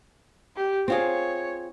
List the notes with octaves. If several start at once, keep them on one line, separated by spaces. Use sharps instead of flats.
G4
C4 F4 G#4 C#5